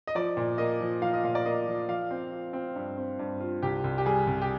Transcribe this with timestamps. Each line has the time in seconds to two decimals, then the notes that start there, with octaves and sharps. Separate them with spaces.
0.07 D#5
0.15 F3 D5
0.37 A#2
0.58 A#3 D#5
0.81 F3
1.02 F3 F5
1.13 D#5
1.24 A#2 F5
1.35 D5
1.45 A#3 D#5
1.67 F3
1.88 F3 F5
2.11 C4
2.32 F4
2.53 C4
2.76 G2
2.98 C4
3.19 G2
3.41 F4
3.62 C2 G4
3.84 C2
3.98 G4
4.06 G3 G#4
4.27 C2
4.41 G4